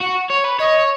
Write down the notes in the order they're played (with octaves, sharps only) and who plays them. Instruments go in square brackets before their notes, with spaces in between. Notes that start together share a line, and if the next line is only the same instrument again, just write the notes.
[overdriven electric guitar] F#4 [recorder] F#5
[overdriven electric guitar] C#5
B4
[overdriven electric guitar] C#5 [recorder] D#5